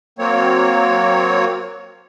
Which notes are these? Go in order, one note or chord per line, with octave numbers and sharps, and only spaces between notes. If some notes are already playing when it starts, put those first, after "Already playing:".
F#3 A#3 C4 C#5